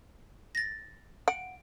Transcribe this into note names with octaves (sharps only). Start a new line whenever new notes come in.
A6 A#6
F#5 D7